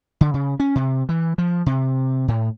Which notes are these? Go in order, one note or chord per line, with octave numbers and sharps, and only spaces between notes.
D3
C#3
C#4
C3
E3
F3
C3
A2